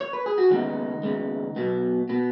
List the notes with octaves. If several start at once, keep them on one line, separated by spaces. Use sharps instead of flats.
C#5
B4
G#4
F#4
D#2 C#3 G#3 B3 D#4
D#2 C#3 G#3 B3
B1 B2 B3
B2 B3